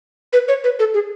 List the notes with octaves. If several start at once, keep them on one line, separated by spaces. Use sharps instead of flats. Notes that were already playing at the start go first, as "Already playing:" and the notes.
B4
C#5
B4
A4
G#4